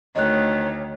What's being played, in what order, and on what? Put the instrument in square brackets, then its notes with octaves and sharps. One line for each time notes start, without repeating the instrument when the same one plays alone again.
[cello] D2 [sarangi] D#3 [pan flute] C#5 [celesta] D#5 F#6